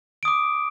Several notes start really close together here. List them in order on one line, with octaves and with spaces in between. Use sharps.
D7 D#6 D6